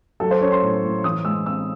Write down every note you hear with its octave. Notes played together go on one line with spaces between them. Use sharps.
F#3 A4
C5
C#4 C#5
C6
A2
A2
E3 D#6
G#3 E6
C4 E6